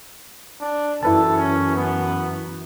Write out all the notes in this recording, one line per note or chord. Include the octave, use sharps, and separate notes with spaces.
D4
F#2 E3 E4 A4 B4 A5
C#4
B3